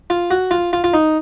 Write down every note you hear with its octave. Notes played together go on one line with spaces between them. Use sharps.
F4
F#4
F4
F4
F4
D#4